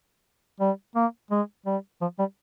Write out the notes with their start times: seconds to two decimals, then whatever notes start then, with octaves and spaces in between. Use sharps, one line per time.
0.60 G3
0.95 A#3
1.31 G#3
1.66 G3
2.01 F3
2.19 G3